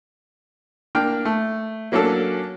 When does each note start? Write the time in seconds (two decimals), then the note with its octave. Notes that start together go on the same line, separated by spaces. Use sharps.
0.95 A#3 D4 G5 F6
1.25 A3
1.92 F#3 A#3 C#4 D4 A4